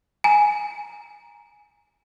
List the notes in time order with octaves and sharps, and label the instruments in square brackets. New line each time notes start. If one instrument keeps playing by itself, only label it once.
[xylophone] G#5 A#5